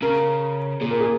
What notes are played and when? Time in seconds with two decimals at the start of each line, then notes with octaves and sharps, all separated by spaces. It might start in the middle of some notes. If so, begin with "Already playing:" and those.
0.02 C#3 A#4
0.81 A#2 G#4
0.91 A#4
1.01 G#4